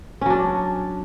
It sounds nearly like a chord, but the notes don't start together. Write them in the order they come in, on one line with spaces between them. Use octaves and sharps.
C#4 F#3 D4